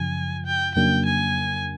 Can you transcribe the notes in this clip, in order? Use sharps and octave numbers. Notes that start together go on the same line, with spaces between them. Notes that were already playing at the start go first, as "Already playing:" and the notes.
Already playing: F#2 C#3 F3 G#5
G5
F2 C#3 F#3 A#3 D4 G5
G#5